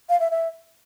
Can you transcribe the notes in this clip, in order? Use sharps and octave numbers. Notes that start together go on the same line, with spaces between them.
F5
E5
E5